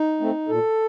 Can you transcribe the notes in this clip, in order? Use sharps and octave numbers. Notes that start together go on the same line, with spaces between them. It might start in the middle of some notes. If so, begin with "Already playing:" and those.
Already playing: D#4
A3 C4
A#2 A4